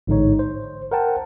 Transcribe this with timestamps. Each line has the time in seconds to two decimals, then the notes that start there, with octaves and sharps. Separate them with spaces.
0.07 A1 G#2 D3 G#3 D#4 C#5
0.39 C5
0.91 A#4 C5 F#5 G5 A5